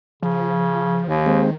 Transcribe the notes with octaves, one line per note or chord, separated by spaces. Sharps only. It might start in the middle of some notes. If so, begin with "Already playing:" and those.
C#3 F3
D#2 D#3
G#3 C4